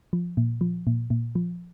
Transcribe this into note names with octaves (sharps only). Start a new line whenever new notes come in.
F3
A#2
F3
A#2
A#2
F3